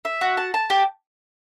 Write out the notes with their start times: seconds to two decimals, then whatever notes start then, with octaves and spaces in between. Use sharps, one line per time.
0.05 E5
0.21 F#4
0.37 A5
0.54 A5
0.70 G4